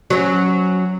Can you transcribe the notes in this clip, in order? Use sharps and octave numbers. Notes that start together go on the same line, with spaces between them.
F#3 C#4